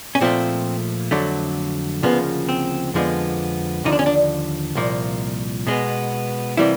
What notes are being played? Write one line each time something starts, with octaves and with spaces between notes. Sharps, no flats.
C#4
A#2 F3 A3 C4
F2 D3 F#3 A3
D2 C#3 F3 A#3 B3
C4
F2 D3 F3 G#3 B3
D#2 D3 F3 D#4
D4
C#4
D4
C2 A#2 F3 A#3
B2 G#3 B3
C3 E3 G3 A#3 E4